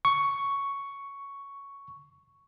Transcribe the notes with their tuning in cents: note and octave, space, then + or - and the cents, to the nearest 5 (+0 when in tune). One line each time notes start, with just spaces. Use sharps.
C#6 +5